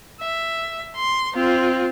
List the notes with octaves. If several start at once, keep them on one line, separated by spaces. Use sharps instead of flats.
E5
C6
C4 F4